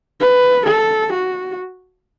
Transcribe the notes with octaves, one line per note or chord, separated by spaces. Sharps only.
B4
A4
F#4